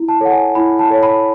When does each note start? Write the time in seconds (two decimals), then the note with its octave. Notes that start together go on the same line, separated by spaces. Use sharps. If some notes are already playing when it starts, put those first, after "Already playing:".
Already playing: E4
0.08 A5
0.20 A4 C#5 F#5
0.32 G#5
0.55 E4 B5
0.79 A5
0.90 A4 C#5
1.03 B5